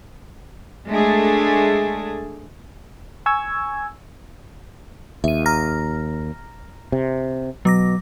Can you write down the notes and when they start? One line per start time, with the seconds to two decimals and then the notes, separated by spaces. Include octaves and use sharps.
0.90 G#3 A3 D4 G#4 A4
3.26 G#5 C#6 E6 G#6
5.24 D#2 E5 D#7
5.46 A#5 F6 A#6
6.92 C3
7.65 B2 F#3 D6 A#6